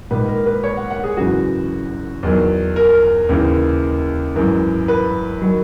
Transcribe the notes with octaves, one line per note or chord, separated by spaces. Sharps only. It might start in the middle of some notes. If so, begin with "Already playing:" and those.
A#1 G#2 D#3 B4
A#4
B4
C#5
F#5
F#5
G#4
G#1 F#2 C#3 E3 F#4
E2 D#3 F#3
A#4
D#2 C#3 E3
G#1 F#2 E3
B4
D#3 F#3